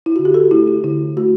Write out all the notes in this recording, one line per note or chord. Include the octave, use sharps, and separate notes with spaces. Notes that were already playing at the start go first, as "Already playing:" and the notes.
E4
D3 F#4
G4
F#4 A4
A3 E4 G4
E4
D3 E4
A3 F#4